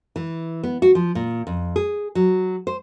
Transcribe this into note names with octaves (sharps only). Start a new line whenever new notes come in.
E3
B3
F#4
F3
A#2
F2
G#4
F#3
C5